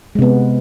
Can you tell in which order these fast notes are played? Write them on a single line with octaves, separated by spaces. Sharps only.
G#3 C3 B3